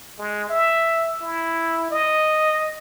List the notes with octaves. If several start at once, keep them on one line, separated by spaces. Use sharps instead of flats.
G#3
E5
E4
D#5